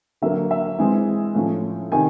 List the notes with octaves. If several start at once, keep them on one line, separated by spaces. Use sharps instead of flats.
D3 F#3 A#3 E5
E5
E3 G#3 C4
A2 F3 A3 C#4
C3 D#3 G#5